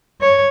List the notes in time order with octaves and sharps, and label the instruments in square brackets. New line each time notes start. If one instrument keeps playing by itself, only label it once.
[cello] C#5